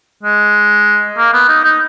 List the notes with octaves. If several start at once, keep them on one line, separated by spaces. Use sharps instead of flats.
G#3
A#3
B3
D#4
D#4